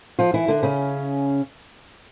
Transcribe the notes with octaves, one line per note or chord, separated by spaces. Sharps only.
F3 F4
E3 E4
D3 D4
C#3 C#4